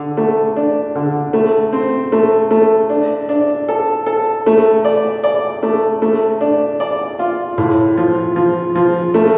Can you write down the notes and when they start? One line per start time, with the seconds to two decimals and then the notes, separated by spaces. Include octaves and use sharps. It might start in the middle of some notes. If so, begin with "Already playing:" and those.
Already playing: D3
0.17 A3
0.56 D4
0.95 D3
1.33 A3
1.73 C4
2.12 A3
2.51 A3
2.90 D4
3.29 D4
3.68 A4
4.06 A4
4.46 A3
4.85 D5
5.24 D5
5.63 A3
6.02 A3
6.41 D4
6.80 D5
7.19 F4
7.58 A2
7.97 F3
8.36 F3
8.75 F3
9.14 A3